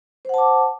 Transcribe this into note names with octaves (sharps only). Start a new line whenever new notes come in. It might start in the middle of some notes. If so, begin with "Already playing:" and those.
C5 F#5 A5 D6